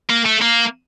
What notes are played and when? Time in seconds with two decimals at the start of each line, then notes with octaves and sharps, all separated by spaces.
0.10 A#3
0.25 A3
0.41 A#3